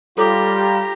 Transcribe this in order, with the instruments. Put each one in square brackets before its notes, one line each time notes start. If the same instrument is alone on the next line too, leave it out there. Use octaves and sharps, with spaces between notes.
[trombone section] G3 F4 [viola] G4 [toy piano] A4 C#5 D6 [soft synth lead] A#5